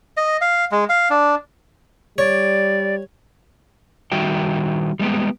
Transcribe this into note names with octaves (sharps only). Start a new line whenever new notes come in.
D#5
F5
G#3
F5
D4
G3 C#5 D5
D#3 G3 F#4 E5 G5
G3 G#3 B3 G4